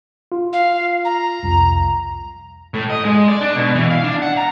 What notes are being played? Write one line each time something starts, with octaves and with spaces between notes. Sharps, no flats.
F4
F5
A#5
C2 F2
A2
D#5
G#3
D5
D4
B2
E3
F5
D4
F#5
A#5